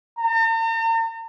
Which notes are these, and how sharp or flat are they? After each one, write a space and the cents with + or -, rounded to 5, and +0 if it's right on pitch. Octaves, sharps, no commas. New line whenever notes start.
A#5 -45